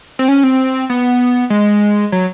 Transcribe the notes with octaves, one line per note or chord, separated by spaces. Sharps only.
C4
C#4
C4
B3
G#3
F#3